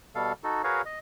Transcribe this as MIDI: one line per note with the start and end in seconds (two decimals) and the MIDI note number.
0.15 0.32 47
0.15 0.32 55
0.15 0.32 69
0.15 0.32 77
0.44 0.62 63
0.44 0.62 66
0.44 0.62 69
0.64 0.82 66
0.64 0.82 68
0.64 0.82 70
0.64 0.82 71
0.64 0.82 73
0.64 0.82 77
0.86 0.99 75